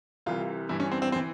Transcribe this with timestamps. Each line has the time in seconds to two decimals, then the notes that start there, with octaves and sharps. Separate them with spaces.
0.26 C2 C3 E3 F4
0.69 G2 E3 E4
0.80 C#4
0.92 C4
1.02 C4
1.12 C4
1.16 E3